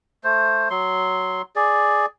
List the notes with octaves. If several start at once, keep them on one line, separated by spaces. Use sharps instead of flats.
A3 C5
F#3 C6
G#4 D5